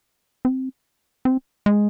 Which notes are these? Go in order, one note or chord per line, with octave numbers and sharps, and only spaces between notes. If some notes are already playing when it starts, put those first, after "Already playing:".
C4
C4
G#3